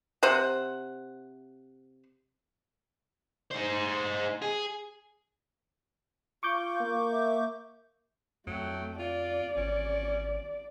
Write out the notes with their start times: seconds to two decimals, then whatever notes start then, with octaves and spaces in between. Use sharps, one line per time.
0.23 C3 C5 F#5
3.51 D#4 C5
4.42 G#4
6.43 F4 C#6 D6 G6
6.81 A#3
7.11 E5
8.47 F2 F#3 A3 G5
8.99 F4 D5
9.56 G#1 C#4